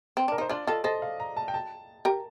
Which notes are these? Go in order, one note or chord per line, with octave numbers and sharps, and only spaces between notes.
C4
D4 A#4
D#4 C5
D4 F4 D5
F4 A4 D#5
A4 C5 D#5
F5
A#5
A5
G5
A5
G4 A#4